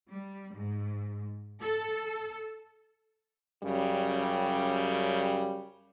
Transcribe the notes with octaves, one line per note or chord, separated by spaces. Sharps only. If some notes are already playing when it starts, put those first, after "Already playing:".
G3
G#2
A4
F#2 C#3 G3